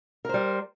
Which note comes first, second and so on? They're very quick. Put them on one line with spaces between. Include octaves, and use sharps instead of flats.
A#4 C5 G3